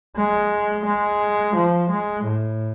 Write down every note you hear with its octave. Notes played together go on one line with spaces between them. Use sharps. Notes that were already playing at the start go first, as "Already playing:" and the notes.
G#3
G#3
F3
G#3
A2